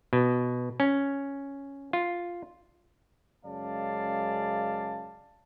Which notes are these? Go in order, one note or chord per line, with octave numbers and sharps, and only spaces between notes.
B2
C#4
F4
F#2 C#3 G#3 D5 F5 A5